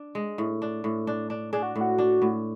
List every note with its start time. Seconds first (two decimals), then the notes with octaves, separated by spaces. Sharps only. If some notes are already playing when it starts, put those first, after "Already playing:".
Already playing: D4
0.15 G#3
0.38 A2
0.62 D4
0.84 A2
1.07 D4
1.30 D4
1.53 D4 G#4
1.63 F#4
1.76 A2
1.81 F#4
1.98 D4
2.22 A2